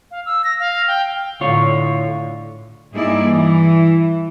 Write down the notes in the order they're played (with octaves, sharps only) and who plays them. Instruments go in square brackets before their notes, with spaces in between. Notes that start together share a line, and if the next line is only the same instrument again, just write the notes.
[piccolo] F5
E6
A#6
F5
G5
[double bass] A2 D3 [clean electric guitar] F4 C#5
[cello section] G2 A#3 D#4 E4 G#4 D5
E3